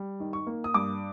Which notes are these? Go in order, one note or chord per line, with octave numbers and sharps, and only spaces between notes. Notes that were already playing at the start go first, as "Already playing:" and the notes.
Already playing: G3
D#3
C#6
A#3
D#6
G2 D6